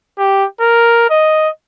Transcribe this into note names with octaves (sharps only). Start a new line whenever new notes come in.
G4
A#4
D#5